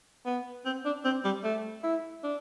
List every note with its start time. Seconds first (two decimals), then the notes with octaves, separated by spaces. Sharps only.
0.26 B3
0.65 C4
0.85 D4
1.05 C4
1.25 G3
1.44 A3
1.84 E4
2.24 D4